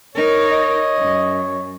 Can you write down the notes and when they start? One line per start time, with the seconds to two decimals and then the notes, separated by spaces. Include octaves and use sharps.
0.15 D#4 A#4 C#5
0.51 D#5
0.98 F#2